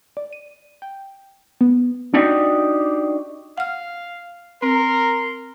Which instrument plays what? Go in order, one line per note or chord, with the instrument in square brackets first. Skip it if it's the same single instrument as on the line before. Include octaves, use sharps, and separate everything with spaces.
[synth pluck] D5
D#7
G5
B3
[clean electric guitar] D4 D#4 F#4 G4 D5 D#5
[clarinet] F5 [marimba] F#5 F6
[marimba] C4 [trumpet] A#4 [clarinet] C6